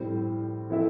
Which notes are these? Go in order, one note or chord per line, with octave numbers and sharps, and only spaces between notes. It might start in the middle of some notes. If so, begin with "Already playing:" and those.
Already playing: A2 G3 C4 G4
E3 C4 E4 A4 E5